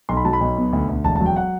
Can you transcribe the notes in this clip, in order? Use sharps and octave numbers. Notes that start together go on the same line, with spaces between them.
B1 C6
B5
F#3 A5
B5
B1
B2
D2
D2
E1 A5
A5
F#3
G5
F#5